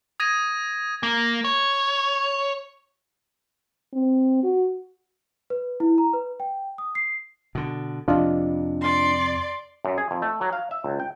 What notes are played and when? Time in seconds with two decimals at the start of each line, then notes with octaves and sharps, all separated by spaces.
0.20 D#6 G#6 A#6 D#7
1.03 A#3
1.45 C#5
3.93 C4
4.43 F#4
5.50 B4
5.80 E4
5.98 A#5
6.13 B4
6.40 G5
6.78 D#6
6.95 C7
7.55 B2 D3
8.08 F2 C3 D4 F4 D#5
8.81 D5 C6
9.85 F#2
9.98 G#4
10.11 F2
10.22 A3
10.41 F#3
10.53 F5
10.71 E5
10.84 C#2
11.00 G5